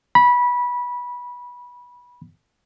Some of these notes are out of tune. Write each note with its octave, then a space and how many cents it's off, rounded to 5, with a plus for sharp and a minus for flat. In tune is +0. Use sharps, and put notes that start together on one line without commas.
B5 -20